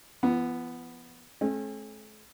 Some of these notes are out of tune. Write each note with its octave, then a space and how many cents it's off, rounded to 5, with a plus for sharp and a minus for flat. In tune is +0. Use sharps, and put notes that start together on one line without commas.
F3 -45 B3 +0
A3 -45 C#4 -45